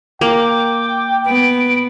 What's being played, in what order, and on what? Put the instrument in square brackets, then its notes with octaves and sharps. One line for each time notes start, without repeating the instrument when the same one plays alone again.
[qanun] A#3 [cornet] G5 [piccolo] D6
[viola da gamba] B3 [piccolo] D7